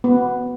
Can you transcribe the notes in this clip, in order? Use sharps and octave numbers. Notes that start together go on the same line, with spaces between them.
B3